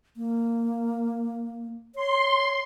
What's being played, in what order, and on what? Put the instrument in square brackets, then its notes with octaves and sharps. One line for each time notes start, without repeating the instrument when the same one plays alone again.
[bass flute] A#3
[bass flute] C#5 [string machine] C6